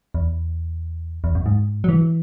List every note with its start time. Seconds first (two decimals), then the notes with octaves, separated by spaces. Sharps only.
0.15 E2
1.24 E2
1.35 F#2
1.46 G#2
1.84 F#3
1.89 E3